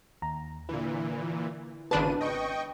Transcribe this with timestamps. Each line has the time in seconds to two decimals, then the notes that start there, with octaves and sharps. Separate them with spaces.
0.22 D#2 A#5
0.69 A#2 D3 E3 E4
1.91 G#1 C#3 D4 B4 A5 D#7
2.21 D#5 G5 C#6